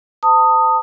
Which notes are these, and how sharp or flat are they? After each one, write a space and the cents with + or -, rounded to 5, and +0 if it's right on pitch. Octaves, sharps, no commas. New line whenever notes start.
C5 -45 A5 +30 D#6 +0